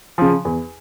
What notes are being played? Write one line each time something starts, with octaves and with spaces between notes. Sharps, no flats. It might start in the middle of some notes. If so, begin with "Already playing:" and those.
C#3 F3
E2